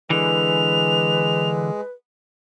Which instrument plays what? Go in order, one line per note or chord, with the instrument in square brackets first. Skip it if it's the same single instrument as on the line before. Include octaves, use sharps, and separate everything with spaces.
[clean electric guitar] D3 E3 [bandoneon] G#3 [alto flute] B4 [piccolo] F7